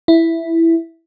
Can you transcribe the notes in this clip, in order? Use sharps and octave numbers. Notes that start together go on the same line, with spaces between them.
E4